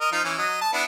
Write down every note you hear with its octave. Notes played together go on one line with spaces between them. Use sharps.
A#4 D#5
F3 D#4 F4
E3 C#4
F#3 D#5
A5
B3 D4 E4